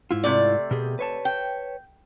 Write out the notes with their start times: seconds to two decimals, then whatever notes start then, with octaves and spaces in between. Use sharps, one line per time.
0.11 G#2 E4 F4
0.24 C3 A3 D5
0.71 B2 G4 G#4
0.99 B4 C#5 A5
1.25 G5